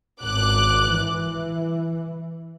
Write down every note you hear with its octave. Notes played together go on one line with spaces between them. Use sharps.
G#1 D6 F#6
E3